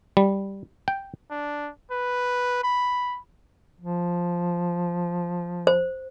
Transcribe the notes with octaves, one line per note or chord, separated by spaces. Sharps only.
G3
G5
D4
B4
B5
F3
C5